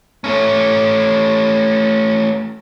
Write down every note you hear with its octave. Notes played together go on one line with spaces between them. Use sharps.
A3 C#4